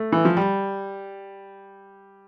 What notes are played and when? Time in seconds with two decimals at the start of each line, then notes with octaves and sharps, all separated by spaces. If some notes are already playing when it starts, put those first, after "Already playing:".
Already playing: A3
0.12 E3
0.25 F3
0.37 G3